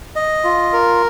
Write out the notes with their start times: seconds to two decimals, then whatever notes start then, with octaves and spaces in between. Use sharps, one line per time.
0.16 D#5
0.44 F4
0.73 A#4